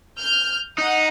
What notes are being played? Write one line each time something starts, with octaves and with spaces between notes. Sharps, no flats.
F6 G6
D#4 F#5 A#5 D#6